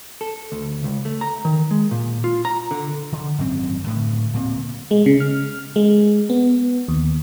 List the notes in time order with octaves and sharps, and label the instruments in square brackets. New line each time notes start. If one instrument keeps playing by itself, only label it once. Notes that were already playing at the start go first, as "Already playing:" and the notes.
[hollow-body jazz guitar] A4
D2
C#2
A3
A#5
D#3
G#3
A#2
F4
A#5
D3
[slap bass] D3
G#1 F#2 C4
A2 D3
D1 A#2 C4
[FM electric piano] G#3
C#3
F6
G#3
B3
D#2